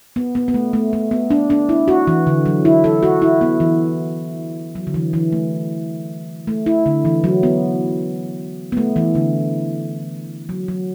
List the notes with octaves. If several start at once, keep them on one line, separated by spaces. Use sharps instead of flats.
B3
B3
B3
A3
A3
A3
B3
D4
D4
E4
F#4
E3
D3
F#3
E4
A4
F#4
E4
B3
E3
F#3
D3
E3
E3
A3
A3
E4
D3
E3
F#3
B3
B3
A3
E3
D3
F#3
F#3